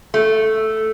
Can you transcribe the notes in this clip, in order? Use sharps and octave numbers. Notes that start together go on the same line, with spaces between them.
A3